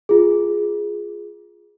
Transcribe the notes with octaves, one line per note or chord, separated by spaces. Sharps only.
F4 G#4